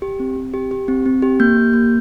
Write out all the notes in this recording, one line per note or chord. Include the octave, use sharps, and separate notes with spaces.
G4
C4
C4
G4
G4
C4
C4
G4
A#3 G6
G4
A#3